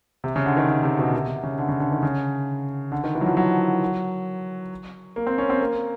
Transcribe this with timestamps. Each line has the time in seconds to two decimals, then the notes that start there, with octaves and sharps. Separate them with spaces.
0.24 C3
0.36 C#3
0.46 D3
0.57 D#3
0.69 D3
0.83 C3
0.99 B2
1.13 C3
1.28 C3
1.43 C#3
1.58 D3
1.69 C#3
1.80 D3
1.92 D#3
2.03 C#3
2.92 D3
3.04 D#3
3.15 E3
3.21 F#3
3.26 F3
3.37 F#3
5.16 A#3
5.27 C4
5.38 C#4
5.50 C4
5.61 A#3